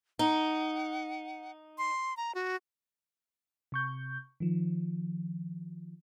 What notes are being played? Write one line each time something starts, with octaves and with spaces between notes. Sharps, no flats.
D#4 F#5
C6
A#5
F#4
C3 C#6 G6
D#3 F3